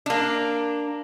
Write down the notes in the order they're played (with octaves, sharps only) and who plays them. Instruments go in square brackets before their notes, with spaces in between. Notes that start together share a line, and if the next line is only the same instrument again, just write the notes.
[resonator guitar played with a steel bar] A#3 D4